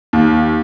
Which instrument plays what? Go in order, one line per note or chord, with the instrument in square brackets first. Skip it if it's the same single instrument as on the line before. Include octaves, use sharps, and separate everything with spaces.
[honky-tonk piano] D#2